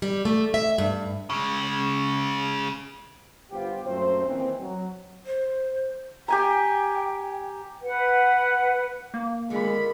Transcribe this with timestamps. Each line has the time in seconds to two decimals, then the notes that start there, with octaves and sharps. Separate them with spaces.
0.02 G3
0.25 A3
0.54 E5
0.78 G2
1.30 C#3 G#3
3.51 G1 B3 F4 G4 C5 G5
3.85 F#2 A#2 A3 C4 C5
4.26 D#2 A#2 D#3 E3 C4
4.60 F#3
5.26 C5
6.28 G4 G5 G#5 A#5
7.82 B4 F#5
9.14 A#3
9.50 D3 D#3 G#3 F4 B5